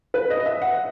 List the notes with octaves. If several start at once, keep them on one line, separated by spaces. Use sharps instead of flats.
B4
D#5
E5
F#5